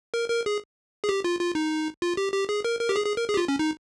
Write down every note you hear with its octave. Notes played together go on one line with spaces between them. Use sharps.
A#4
A#4
G#4
G#4
G4
F4
F4
D#4
F4
G4
G4
G#4
A#4
A#4
G4
G#4
G#4
A#4
G#4
G4
F4
C#4
D#4